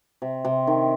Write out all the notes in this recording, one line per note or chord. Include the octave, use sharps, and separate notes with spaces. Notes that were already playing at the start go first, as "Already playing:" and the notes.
C3
C3
D#3